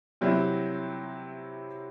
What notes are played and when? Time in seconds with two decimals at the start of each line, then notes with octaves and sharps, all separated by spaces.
0.21 C3 F#3 C4 E4